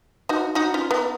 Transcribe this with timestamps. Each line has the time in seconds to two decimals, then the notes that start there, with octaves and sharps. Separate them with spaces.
0.29 D#4 F#4
0.55 D#4 F#4
0.74 C#4 F4
0.91 B3 D#4